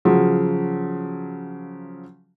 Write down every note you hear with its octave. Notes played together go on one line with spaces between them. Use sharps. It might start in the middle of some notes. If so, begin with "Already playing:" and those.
C#3 F3 F#3